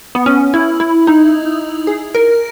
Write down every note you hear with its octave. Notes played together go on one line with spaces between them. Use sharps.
B3
C#4
E4
E4
D#4
G#4
A#4